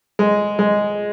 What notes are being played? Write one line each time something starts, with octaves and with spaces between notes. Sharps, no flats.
G#3
G#3